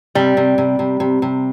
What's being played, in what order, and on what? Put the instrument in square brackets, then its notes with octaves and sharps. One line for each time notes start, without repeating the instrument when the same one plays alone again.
[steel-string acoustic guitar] C3 [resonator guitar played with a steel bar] G3
[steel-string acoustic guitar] C3
C3
C3
C3
C3